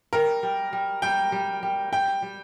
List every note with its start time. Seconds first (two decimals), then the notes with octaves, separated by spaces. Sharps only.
0.13 G3 A#4
0.43 G3
0.73 G3
1.02 G3 G5
1.32 G3
1.63 G3
1.92 G3 G5
2.22 G3